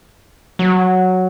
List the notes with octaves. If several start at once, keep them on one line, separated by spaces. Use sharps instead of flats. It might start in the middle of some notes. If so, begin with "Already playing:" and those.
F#3